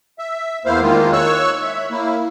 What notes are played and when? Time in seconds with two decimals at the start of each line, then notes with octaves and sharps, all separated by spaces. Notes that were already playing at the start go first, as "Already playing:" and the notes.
0.19 E5
0.66 E2 A#3 E4 C5 F5
0.81 D#3 G#3 A#3 F4
1.13 C#5 C#6 E6 F#6
1.63 E5
1.91 A#3 E4